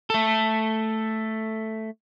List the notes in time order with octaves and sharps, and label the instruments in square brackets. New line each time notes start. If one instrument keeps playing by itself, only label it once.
[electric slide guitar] A3 A4